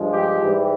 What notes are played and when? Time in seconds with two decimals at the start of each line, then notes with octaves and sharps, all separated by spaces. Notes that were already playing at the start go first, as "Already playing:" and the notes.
Already playing: G2 F3 G#3
0.11 G4
0.41 G#2 E3 G3